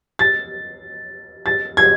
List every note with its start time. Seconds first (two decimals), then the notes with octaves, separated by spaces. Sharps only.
0.19 A6
1.46 A6
1.77 G#6